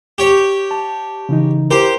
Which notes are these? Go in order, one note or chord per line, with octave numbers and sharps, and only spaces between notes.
G4 C#5
A5
C#3 E3 D#4
E4 G4 A#4 C5